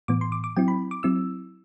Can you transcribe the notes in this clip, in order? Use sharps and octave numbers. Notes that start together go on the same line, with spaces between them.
A2 E3 B3 D6
C6
D6
D6
F#3 C4 E4 G5
B5
D6
F#3 C4 E4 E6